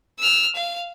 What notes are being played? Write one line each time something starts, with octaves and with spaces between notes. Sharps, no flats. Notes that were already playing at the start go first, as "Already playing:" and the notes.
E6 F6
F5